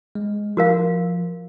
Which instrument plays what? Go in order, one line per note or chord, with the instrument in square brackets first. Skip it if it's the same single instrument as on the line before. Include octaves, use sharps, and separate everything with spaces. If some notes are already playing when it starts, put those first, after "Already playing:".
[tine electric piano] G#3
[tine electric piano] F3 [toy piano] F#4 A#4 F5